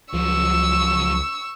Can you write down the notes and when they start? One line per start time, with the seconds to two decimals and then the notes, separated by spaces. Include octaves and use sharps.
0.14 C#2 F3 F#3 C#6 E6